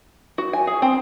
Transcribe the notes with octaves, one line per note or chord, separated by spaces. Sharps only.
F#4
G#5
G#4
C4